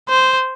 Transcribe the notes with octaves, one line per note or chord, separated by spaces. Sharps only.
C5